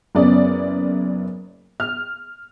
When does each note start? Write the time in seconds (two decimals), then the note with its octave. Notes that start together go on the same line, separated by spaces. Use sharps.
0.15 F#1 B3 C#4 D5
1.80 F6